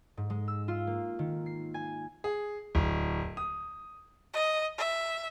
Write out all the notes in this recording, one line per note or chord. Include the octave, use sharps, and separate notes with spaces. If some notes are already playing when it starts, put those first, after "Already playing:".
G#2
G#3
E6
F4
A#3
D#3
C7
G#5
G#4
D1
D#6
D#5
E5